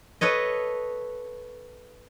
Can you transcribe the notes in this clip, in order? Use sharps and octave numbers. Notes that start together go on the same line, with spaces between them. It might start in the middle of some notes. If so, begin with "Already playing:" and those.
A4 B4 C#5 D#5